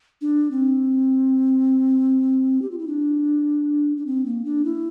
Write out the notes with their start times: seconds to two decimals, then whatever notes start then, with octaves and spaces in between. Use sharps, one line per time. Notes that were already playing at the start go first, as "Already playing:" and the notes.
0.21 D4
0.51 C4
2.62 G4
2.71 F4
2.79 E4
2.87 D4
3.97 D4
4.06 C4
4.26 A#3
4.45 D4
4.65 E4